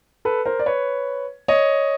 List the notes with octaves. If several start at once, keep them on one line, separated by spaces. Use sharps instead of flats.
A4 B4
A#4 C5
D5
B4 C#5
C#5 D#5